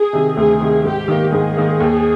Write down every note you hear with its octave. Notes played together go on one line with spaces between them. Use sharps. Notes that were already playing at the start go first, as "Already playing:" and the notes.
Already playing: G#4
C3 D#3
D2 G#4
C3 D#3
G#2 G4
D#3 A#3
G#2 G#4
D#3 A#3
D#2